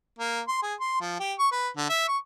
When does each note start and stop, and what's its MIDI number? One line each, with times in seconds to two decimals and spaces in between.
0.19 0.41 58
0.48 0.60 84
0.62 0.74 68
0.80 0.97 84
1.01 1.18 53
1.20 1.34 67
1.39 1.47 85
1.52 1.69 71
1.76 1.86 50
1.90 2.05 76
2.08 2.18 85